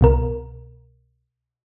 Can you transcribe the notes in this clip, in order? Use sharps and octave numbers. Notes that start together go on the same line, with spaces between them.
C2 B2 A#4